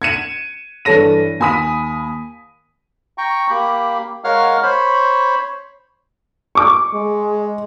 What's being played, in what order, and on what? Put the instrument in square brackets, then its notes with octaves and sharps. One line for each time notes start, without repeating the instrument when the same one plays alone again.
[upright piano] G#6 C#7 D#7 E7
G2 E3 A4 C#5 A#6 D#7
D#2 G#5 B5 D#6 B6 D#7
[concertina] G5 A#5 C#6
A#3 G4 B5
G#3 A#4 C#5 F5 F#5 F6
C5 C#5 B5
[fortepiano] C#6 D6
[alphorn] G#3